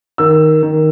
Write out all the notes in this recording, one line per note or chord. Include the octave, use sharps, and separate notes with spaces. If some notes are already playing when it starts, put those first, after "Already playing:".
D#3 E6
D#3